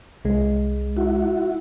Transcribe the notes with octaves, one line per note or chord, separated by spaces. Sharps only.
C2 G#3
E4 F#4